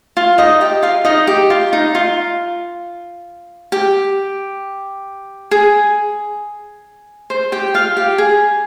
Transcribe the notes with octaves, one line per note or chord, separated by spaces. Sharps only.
F4
D#4 D#5
G4 G5
F4 F5
D#4 D#5
G4
F4
D#4
F4
G4
G#4
C5
G4 G5
F4 F5
G4
G#4